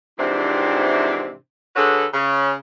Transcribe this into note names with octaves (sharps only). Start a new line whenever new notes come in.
F2 G#2 C3 E3 C4 D4
D3 F#4 G#4 A4 B4 C#5
C#3